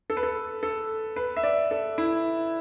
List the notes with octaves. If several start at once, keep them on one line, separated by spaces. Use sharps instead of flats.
A4
B4
A4
A4
B4
E5
D5
A4
E4